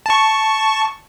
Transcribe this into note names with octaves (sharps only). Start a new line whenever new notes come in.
A5 C#6